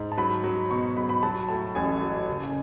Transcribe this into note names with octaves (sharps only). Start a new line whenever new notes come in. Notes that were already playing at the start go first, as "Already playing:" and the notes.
Already playing: G#2
A5
F#3 B5
F#3
B2 C#6
F#3 B5
B5
F#3 A5
A2 A5
A1 G#5
F#3
F#1